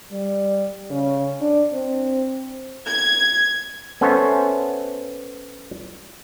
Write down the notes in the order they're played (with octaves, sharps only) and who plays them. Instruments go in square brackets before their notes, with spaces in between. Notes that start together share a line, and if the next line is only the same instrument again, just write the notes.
[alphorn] G3
C#3
D4
C4
[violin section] G#6
[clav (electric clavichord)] B3 C#4 A4 C5 C#5 E5